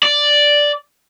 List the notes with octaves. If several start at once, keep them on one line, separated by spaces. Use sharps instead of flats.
D5